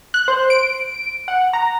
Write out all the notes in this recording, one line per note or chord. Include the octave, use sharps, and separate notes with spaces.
F#6
C5
D7
F#5
A#5